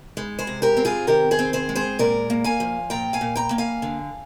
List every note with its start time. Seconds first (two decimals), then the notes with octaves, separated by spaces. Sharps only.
0.17 G#3 D#4
0.39 G#4 C5
0.47 C3
0.62 G4 A#4
0.77 C4
0.85 F4 G#4
1.07 D#3 G4 A#4
1.31 G#4 C5
1.39 C4
1.53 G#4 C5
1.69 G#3
1.76 G#4 C5
1.99 A#2 A#4 D5
2.30 A#3
2.44 F5 G#5
2.60 F3
2.90 A#2 G5 A#5
3.13 F5 G#5
3.21 A#2
3.36 G5 A#5
3.51 A#3
3.58 F5 G#5
3.82 D3